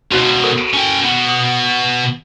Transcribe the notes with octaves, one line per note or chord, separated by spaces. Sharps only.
C#2 B2 F#4 C5 F5
A4 A#4 C5
C#4 G5
B2 B3
D#6